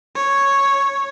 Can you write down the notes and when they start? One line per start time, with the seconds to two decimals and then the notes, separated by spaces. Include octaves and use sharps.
0.15 C#5